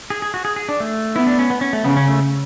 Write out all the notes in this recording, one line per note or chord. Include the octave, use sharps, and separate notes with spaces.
G#4
G#4
F#4
G#4
G#4
D4
A3
B3 E4
D4
C#4
B3
C#4
A3
C#3 B3
C#4
A3